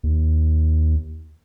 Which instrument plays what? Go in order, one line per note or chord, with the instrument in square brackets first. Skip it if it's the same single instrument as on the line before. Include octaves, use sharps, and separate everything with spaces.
[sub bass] D#2